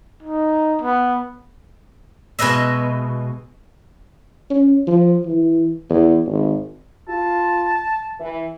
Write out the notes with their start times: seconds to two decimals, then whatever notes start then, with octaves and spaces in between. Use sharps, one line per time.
0.23 D#4
0.82 B3
2.39 B2 G#3 B4 D#5 E5
4.50 C#4
4.87 F3
5.25 E3
5.90 E2
6.26 G#1
7.09 F4 A5
8.20 E3